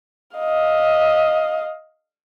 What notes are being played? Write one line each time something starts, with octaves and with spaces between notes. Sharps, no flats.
D#5 F5